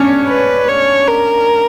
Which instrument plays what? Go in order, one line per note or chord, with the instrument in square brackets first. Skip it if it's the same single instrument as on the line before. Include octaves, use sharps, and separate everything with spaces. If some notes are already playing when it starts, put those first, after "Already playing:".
Already playing: [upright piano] C#4 D4 [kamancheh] C#5
[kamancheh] B4
C#5
A#4